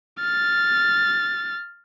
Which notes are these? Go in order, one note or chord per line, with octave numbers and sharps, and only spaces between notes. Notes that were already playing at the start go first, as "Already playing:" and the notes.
F6 A6